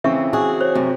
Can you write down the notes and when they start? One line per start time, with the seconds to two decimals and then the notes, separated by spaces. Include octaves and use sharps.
0.04 C#3 E3 C4 E5 C#6
0.33 F#4 G#4
0.61 C5 C#5
0.75 F#2 C3